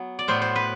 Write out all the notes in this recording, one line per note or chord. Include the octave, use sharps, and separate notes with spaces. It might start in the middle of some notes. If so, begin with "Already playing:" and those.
Already playing: F#3 B3
D5
A2 F#3 B3 C5
C5
B4